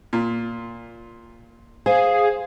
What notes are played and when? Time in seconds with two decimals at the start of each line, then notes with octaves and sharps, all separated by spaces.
0.13 A#2
1.86 G#4 C5 F5